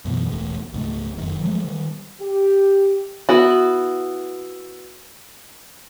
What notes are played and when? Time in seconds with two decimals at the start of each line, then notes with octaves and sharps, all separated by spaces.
0.05 F#2 B2 E3
0.27 E1 A1 A2
0.73 C#2 G#2 A3
1.17 F1 F#2 D#3
1.41 F3 F#3 G#3 A3
1.64 D#3 G3
2.20 G4
3.29 B3 E4 F#4